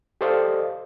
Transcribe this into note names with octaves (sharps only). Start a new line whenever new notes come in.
G4 A4 C5 D5 D#5 F5